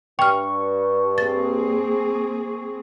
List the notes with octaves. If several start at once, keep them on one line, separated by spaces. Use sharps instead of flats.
G2 G5 C#6 F6
A#3 C4 G#4 A6